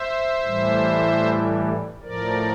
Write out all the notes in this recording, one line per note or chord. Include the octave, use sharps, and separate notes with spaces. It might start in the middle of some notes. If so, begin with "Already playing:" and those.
Already playing: C5 E5
A2 E3 G3
A2 F3 A#4 D5